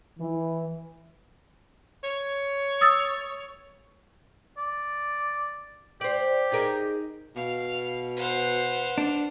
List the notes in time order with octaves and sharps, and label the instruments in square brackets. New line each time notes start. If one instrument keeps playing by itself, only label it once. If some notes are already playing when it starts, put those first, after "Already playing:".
[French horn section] E3
[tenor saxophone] C#5
[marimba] D#6 E6 A6
[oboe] D5
[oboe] G4 [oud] C5 D5
[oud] D#4 G#4 A#4
[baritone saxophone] B2 [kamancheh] F5
[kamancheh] B4 F#5 [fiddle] C5 F5
[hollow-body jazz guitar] D4